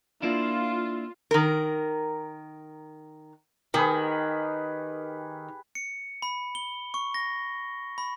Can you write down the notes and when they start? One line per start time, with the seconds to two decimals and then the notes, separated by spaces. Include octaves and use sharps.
0.22 A#3 D4 E4 F4
1.31 D#3 A#4
3.74 D#3 G4 G#4 B4
5.75 C#7
6.22 B5
6.55 G7
6.94 C#6
7.14 A#6
7.98 B5